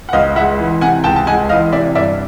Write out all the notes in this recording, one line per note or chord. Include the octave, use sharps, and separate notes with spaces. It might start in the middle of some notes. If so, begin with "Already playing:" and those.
F#5
C#2 D#5 F5
G#3 E5 F#5
E3
C3 F#5 G#5
C#2 G5 A5
A5
G#3 F#5 G#5
E3 D#5 F5
C3 D5 E5
G2 D5 E5